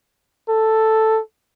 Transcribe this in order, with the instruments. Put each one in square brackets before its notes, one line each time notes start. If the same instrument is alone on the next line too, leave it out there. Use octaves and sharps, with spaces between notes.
[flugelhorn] A4